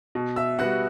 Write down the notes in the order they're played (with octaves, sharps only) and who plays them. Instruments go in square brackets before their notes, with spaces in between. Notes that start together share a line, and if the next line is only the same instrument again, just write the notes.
[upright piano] B2
[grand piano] E5 E6
[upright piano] G3 B3 F#4 [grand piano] F#5 F#6